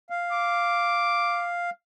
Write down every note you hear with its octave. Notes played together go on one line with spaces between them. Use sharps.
F5
D6